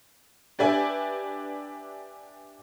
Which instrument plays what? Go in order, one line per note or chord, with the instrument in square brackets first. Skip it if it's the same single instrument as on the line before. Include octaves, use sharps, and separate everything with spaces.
[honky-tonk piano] D4 G4 B4 D5 E5 G#5